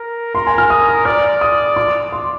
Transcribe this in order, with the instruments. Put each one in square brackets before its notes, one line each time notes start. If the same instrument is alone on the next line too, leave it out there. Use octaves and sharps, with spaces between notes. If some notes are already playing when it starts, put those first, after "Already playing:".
Already playing: [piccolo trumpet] A#4
[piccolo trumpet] A#4 [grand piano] C6
[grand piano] G#5
F6
D#6
[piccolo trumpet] D5 [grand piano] F6
[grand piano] D#6
D6
C6